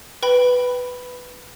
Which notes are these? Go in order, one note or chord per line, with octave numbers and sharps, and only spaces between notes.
B4 G5 B5